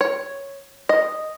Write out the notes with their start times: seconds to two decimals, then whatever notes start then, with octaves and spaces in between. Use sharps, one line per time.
0.01 C#5
0.89 D#5